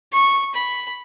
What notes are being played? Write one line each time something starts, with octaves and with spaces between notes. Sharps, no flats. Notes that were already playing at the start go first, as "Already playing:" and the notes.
C#6
B5